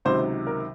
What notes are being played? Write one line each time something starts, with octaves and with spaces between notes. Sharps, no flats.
C#2 C3 D#3 F#3 C5
A#4